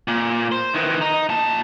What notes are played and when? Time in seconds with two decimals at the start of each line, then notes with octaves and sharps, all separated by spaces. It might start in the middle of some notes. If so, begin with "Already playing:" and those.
0.08 A#2
0.52 C5
0.74 D#3 E3
1.01 D#4
1.29 A#2 A5